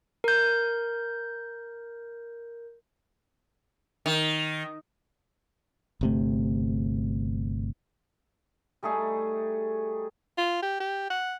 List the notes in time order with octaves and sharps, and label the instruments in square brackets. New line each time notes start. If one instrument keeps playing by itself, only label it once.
[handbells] A#4 G6
[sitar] D#3
[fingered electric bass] G1 C3 A3
[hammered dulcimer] G3 A3 D#4 G#4
[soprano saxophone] F4
G4
G4
F#5